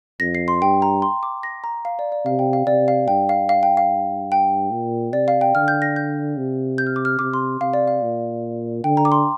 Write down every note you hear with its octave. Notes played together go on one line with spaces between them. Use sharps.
F2 A#6
C7
C6
G2 G5
A#5
C6
D6
A#6
A#5
F5
D5
D5
C3 F5
G5
F5
C3 D5
F5
G2 G5
F5
F5
G5
F5
G5
A#2
C3 D5
F5
G5
D3 F6
G6
A#6
G6
C3
G6
F6
D6
F6
C3 D6
C6
C3 F5
D5
F5
A#2
D3 G5
A#5
D6
C6